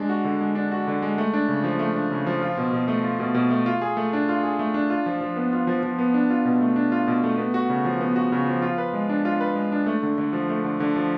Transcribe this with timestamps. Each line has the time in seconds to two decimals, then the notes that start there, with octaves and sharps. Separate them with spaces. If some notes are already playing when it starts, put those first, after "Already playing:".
Already playing: G#3 D4
0.10 F#4
0.25 D3
0.41 G#3
0.55 D4
0.72 F#4
0.87 D3
1.02 G#3
1.18 A3
1.33 D4
1.48 C#3
1.64 F3
1.79 A3
1.96 D4
2.11 C#3
2.27 F3
2.42 F4
2.57 B2
2.73 B2
2.88 A3
3.04 F4
3.20 B2
3.34 B2
3.50 A3
3.66 F4
3.82 G#4
3.97 A3
4.13 D4
4.29 F4
4.43 G#4
4.59 A3
4.74 D4
4.90 F4
5.06 F3
5.21 F3
5.36 B3
5.53 F4
5.67 F3
5.83 F3
5.98 B3
6.14 D4
6.30 F4
6.45 B2
6.61 A3
6.76 D4
6.92 F4
7.07 B2
7.24 A3
7.38 B3
7.54 F#4
7.70 C#3
7.85 F3
8.01 B3
8.16 F#4
8.32 C#3
8.47 F3
8.62 F4
8.78 B4
8.93 G#3
9.09 D4
9.25 F4
9.41 B4
9.55 G#3
9.72 D4
9.86 A3
10.03 D3
10.18 D3
10.33 F3
10.49 A3
10.64 D3
10.80 D3
10.96 F3